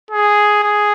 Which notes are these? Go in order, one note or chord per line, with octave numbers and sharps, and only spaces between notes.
G#4
G#4